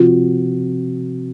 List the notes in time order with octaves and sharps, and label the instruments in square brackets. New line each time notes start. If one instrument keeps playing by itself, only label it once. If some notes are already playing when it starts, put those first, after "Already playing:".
Already playing: [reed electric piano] C3 F3 C4 F#4 [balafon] F4